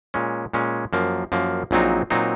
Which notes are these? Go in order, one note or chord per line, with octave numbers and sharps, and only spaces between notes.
A#2 G#3 C#4
A#2 G#3 C#4
F#2 F3 A#3
F#2 F3 A#3
A#1 A#2 F#3 C4 D#4
A#2 F#3 C4 D#4